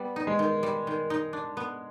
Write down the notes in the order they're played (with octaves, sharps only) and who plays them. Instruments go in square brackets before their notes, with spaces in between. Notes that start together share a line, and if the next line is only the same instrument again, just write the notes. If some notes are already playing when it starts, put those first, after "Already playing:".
Already playing: [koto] G3 [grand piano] B3
[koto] D#4
[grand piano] G#3
[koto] D#3
G3
D#3
D#4
D4
B3